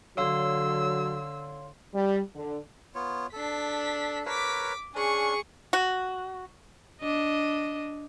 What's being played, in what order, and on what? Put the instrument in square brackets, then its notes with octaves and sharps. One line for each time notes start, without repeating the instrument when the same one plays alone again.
[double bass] D3 [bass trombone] F#3 [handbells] C#5 F5 C6 [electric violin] E6
[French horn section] G3
D3
[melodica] B3 F4 C#5
[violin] D4 B6 [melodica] A4
[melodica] A#4 B4 C#5 [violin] D6 B6
[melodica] C#4 D4 [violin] G#4 C#6
[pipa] F#4
[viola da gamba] D4 D#5